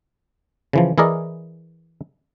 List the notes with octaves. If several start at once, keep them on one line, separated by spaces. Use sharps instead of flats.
C#3 E3 F3
E3 E4 G#4 A#4 D5 D#5